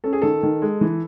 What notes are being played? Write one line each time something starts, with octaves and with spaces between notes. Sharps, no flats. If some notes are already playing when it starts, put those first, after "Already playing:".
C#4 A4
G#4
D#3 A4
D#3
G#3
E3